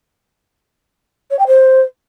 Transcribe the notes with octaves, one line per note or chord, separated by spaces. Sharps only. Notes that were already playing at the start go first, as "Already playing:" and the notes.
C#5
G5
C5